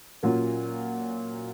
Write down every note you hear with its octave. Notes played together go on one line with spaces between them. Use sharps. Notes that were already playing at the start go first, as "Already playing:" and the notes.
A#2 F#3 A#3 C#4 F4